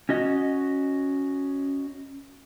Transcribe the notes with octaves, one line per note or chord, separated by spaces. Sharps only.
C#4 F#4 D#5